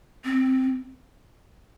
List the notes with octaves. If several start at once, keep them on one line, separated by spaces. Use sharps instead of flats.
C4